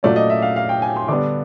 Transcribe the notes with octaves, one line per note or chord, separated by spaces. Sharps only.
A#2 F#3 A3 C#4 D5
D#5
E5
F5
F5
G5
G#5
C6
D3 G3 B3 D4 D6